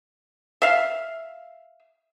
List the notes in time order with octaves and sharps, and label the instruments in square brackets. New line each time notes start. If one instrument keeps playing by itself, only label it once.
[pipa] E5 F5